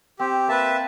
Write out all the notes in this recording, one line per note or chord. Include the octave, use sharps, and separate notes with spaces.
C4 G4
A#3 B4 E5 A5